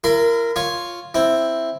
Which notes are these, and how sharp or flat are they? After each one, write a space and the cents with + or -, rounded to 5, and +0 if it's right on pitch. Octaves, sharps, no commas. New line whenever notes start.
E4 +35 A#4 -5 B5 +45
F4 +0 C#5 +0
C4 +0 E4 +0